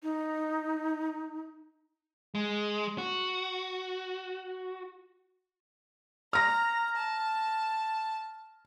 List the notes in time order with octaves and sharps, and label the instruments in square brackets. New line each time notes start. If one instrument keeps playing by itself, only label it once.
[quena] D#4
[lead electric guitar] G#3
F#4
[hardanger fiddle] A#5 [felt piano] F6 A#6
[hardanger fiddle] A5